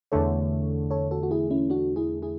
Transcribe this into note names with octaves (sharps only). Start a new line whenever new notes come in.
E2 D3 A3 A4 C#5
A4 C#5
F#4 A4
F#4
E4 G#4
C#4 E4
D4 F#4
E4 G#4
E4 G#4